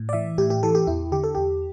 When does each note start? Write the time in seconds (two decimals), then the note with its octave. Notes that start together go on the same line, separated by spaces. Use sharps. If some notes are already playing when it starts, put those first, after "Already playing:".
Already playing: A2
0.09 D5
0.13 E3 E5
0.38 A2 G4
0.50 G4
0.63 E3 A4
0.75 G4
0.87 E2 E4
1.12 D3 G4
1.24 A4
1.35 E2 G4